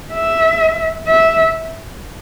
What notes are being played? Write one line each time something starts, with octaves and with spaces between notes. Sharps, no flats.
E5
E5